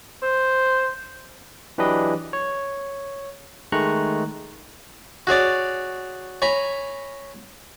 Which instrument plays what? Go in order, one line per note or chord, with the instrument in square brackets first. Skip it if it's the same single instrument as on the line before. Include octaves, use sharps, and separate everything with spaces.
[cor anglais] C5
[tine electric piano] E3 F#3 D4 G4 B4 D#5
C#5
D#3 G#3 A3 A#5 C#6 F#6
[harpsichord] F#4 G#4 C#5 D5
C#5 G#5 A#5 B5